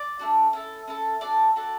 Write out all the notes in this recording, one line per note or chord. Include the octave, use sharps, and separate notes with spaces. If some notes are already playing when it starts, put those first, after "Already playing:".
Already playing: D5 D6
A3 D4 F#4
C#4 E4 A4
C#4 E4 A4
D4 F#4 A4 D5 D6
D4 F#4 A4